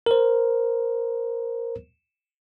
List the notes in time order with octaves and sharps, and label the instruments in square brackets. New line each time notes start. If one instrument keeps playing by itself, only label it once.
[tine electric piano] A#4 C5